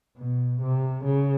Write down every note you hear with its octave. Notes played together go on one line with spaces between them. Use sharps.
B2
C3
C#3